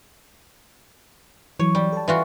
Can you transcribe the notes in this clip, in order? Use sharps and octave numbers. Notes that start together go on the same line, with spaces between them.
E3 F#3 C#5
G3
A4 A5
E3 F4 F#4